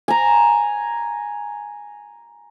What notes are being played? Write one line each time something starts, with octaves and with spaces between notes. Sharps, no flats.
G#5 A#5